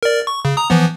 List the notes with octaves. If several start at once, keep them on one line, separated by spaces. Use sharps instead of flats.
A#4 D5
C#6
C#3
A#5 D#6
E3 F3 B3